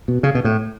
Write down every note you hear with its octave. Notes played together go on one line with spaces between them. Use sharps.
B2
C#3
B2
A2